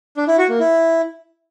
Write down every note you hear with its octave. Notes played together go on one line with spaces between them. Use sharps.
D4
E4
F#4
A#3
E4